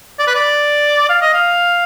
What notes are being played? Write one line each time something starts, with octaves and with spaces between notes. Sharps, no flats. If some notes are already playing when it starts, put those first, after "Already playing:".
D5
B4
D5
F5
D#5
F5